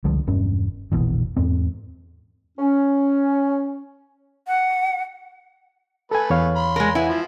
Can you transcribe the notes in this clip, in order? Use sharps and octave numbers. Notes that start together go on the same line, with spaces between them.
C#2 D3 F3 G3
E1 G2 C#4
F1 A#1 B2 E3
E2 G#2 C4
C#4
F#5
A3 A4 B4 G#5
E2 C#5 F5
B5 C6
G#3 A#4
E4 B4 F#5 G#5
F3